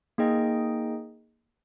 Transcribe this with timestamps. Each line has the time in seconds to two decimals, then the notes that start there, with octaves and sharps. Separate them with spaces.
0.18 A#3 D#4 G#4 D#5 G5